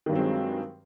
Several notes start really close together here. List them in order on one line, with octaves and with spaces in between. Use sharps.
D#3 G2 F#3 C4 G#3